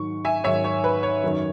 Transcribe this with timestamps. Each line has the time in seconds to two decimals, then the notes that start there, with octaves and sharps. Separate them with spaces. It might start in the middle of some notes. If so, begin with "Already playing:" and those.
Already playing: G#2 D#3 F#3 C#6
0.25 E5 G#5
0.44 G#2 D#3 F#3 C#5 E5
0.64 C#5
0.84 B4
1.03 C#5
1.23 F#2 D#3 F#3